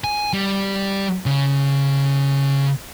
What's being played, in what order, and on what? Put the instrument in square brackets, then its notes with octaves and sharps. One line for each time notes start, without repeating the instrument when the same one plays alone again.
[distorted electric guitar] G#5
G3
C#3